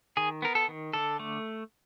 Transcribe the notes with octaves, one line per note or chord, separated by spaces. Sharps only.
D#3 G#4
B3 A#4
A4
D#3
D3 A4
A3